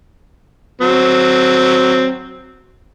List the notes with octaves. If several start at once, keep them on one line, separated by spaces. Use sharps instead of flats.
F#3 C4